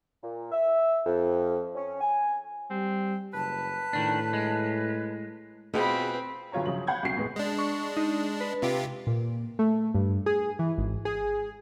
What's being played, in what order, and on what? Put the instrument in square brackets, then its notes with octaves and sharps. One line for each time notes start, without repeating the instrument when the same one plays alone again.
[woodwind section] A#2
E5
F2
C#4
G#5
[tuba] G3 [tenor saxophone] C4
[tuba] F#1 [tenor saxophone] B4 [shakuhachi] A5
[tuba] A2 [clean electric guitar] D#3 D4
[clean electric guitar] G#3
[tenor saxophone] B2 [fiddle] C4 B5 [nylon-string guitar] F4 G#4 B4
[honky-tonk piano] G1 F#3 F4 C#5 A#5
C#3 F3 F#3 C#5 F#7
F5 F#5 B5 G6 G#6
C2 F#3 C#4 C7
D#2 A2 G#3 B3
[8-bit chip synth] G#3 D4
[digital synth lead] C#6
D#4
B4
[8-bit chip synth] C3 F4 G4
[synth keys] A#2
A3
G2
G#4
E3
G#1
G#4